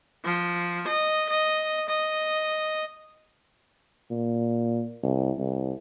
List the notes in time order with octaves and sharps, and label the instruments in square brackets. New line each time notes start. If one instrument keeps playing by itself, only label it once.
[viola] F3
D#5
D#5
D#5
[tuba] A#2
C2
C2